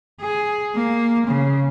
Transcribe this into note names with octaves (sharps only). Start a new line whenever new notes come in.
G#4
A#3
C#3